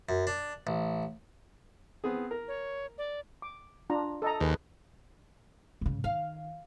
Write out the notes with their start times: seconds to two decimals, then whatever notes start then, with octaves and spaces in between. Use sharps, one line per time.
0.09 F#2
0.27 D4
0.67 A1
2.04 B3 C4 G#4
2.31 A#4
2.48 C#5
2.98 D5
3.42 D6
3.90 D4 F4 A#5
4.22 A4 D#5 A#5
4.40 D#2 G#4 B4
5.81 G#2 C#3
6.04 D#3 F5